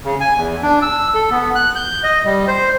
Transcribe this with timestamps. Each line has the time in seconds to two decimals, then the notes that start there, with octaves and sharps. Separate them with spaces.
0.04 C#3
0.20 G#5
0.35 E2
0.62 D4
0.82 E6
1.14 A4
1.31 B3
1.55 F#6
1.76 G6
2.03 D#5
2.25 G3
2.48 C5